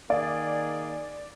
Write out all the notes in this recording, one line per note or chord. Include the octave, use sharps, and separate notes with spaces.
D#3 A#3 G#4 D5